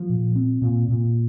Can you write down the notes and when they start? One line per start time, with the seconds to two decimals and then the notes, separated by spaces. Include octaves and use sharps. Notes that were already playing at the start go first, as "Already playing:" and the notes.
Already playing: F3
0.09 A#2
0.36 C4
0.62 A#2
0.88 A#2